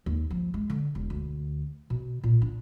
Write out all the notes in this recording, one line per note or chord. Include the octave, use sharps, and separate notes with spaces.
D#2
F3
G#3
D3
E1
D2
B2
A#2
D4